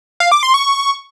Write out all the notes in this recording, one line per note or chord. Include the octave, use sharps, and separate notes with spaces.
F5
D6
C6
C#6